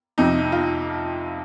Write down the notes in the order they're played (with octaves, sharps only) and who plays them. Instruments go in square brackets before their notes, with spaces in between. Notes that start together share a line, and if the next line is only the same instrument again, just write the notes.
[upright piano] F2 C3 F3 D#4
F4